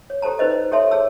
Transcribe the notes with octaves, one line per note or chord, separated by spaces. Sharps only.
C#5
G4 A4 C5 A5 A#5
D#4 B4 C5 D#5
C5
G4 A4 C#5 E5 A5 C6
G#4 C#5 A5 E6